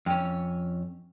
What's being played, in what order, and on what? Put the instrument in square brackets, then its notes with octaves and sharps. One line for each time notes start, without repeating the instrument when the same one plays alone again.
[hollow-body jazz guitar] F2 C#4